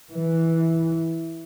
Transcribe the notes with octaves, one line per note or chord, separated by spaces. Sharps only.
E3